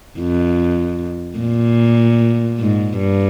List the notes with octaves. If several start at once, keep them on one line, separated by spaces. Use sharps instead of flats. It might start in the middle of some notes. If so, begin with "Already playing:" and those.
F2
A#2
G#2
G2